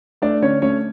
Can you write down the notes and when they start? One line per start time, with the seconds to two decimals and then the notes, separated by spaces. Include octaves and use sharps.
0.22 A3 D4 D5
0.42 D3 C#4 C#5
0.62 A3 C#4 C#5